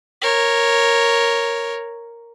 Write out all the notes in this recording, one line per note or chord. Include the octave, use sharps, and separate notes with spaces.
A#4 C#5